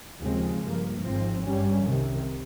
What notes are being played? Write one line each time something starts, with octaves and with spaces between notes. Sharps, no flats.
D#2 C#3 F3 G#3 C4
G2 F3 A#3
G#1 G#2 F3 C4
G2 G3 C#4
C2 C3 D#3